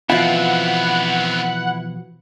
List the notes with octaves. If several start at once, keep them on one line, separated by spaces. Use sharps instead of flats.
B2 E3 F3 B3 C4 E4 F4 F#5